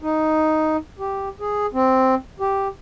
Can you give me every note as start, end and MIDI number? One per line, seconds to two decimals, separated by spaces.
0.02 0.77 63
0.99 1.29 67
1.40 1.66 68
1.74 2.15 60
2.40 2.68 67